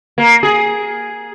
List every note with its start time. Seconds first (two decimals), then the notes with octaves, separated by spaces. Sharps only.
0.18 A#3
0.43 G#4